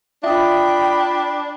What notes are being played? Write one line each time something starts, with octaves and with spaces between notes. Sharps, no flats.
D4 F4 E5 G5 B5 D#6